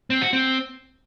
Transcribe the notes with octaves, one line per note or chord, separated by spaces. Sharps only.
C4
F#4
C4